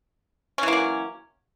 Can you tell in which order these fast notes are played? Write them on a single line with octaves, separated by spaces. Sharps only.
C#4 E3 A#3 F#3